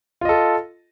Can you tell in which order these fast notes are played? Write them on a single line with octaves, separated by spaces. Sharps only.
F4 D#5 A4